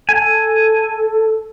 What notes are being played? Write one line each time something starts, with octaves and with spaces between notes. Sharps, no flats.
A4 G#5